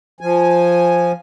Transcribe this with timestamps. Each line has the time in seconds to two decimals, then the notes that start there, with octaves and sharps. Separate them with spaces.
0.21 F3 G#5